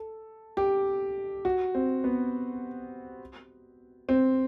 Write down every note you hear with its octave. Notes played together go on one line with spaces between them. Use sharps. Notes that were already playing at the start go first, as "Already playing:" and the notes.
Already playing: A4
G4
F#4
C4
B3
C4